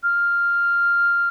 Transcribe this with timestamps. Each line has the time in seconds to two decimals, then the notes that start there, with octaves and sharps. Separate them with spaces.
0.03 F6